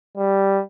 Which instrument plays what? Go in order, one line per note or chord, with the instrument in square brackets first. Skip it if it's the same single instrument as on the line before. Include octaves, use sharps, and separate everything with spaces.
[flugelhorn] G3